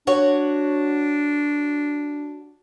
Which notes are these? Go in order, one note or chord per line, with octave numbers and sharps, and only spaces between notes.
D4 F#4 C#5